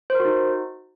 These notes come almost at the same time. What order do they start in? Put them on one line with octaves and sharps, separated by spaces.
C5 A#4 F#4 D#4